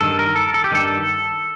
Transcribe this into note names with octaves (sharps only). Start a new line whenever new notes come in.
G2 D#3 A4
A#4
A4
A4
G4
G2 D#3 A4